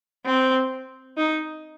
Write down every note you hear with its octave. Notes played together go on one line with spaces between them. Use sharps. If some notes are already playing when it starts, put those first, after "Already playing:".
C4
D#4